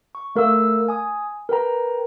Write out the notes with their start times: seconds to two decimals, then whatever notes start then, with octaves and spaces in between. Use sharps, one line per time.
0.15 C#6
0.36 A3 A#4 F5 E6
0.88 G#5 D#6
1.49 A#4 B4 G5 A#5